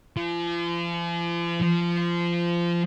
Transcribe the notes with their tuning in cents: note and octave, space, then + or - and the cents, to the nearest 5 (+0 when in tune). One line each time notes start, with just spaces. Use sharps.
F3 -40
F3 -20